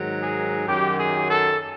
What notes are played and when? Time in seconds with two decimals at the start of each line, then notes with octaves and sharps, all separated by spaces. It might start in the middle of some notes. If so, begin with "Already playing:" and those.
Already playing: G#2 D#3 F#3
0.23 G#4
0.68 F#2 D#3 F#3 G4
0.99 G#4
1.29 A4